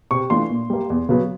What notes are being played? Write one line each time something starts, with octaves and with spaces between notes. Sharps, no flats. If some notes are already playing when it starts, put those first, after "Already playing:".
C3 C#6
E3 A3 D4 F4 C6
A#2
G3 A#3
E2
C#3 F#3 B3